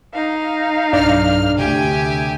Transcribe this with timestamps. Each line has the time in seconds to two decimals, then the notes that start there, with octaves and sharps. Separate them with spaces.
0.14 D#4 F5
0.93 B1 G2 D4 D5 F6
1.58 D2 C3 G4 G#5